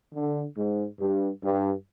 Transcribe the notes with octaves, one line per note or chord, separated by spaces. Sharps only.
D3
G#2
G2
G2